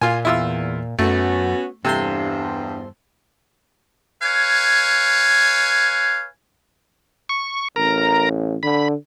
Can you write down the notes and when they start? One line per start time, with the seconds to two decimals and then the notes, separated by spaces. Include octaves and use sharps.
0.01 A#2 F4 G#5
0.25 E2 E4 F4 E6
0.99 F#2 A3 B3 C#4 F#4
1.85 E2 G2 C3 A4 C5 C6
4.23 B4 C#5 F5 G#5
7.29 C#6
7.76 A1 A#4 A#5
8.63 D3 B5